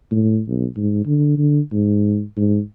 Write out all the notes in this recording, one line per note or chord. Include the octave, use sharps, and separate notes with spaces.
A2
B1
G#2
D3
D3
G#2
G#2